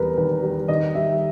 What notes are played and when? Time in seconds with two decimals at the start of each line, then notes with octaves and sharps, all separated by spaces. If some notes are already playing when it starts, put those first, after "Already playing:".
Already playing: E2 G3 A#4 B4
0.18 D#3 B4
0.43 G3
0.68 D#3 D#5
0.95 G3 E5